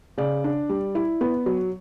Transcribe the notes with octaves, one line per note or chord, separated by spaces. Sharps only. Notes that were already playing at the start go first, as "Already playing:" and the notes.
C#3 D5
D4
G3
E4
B3
F#3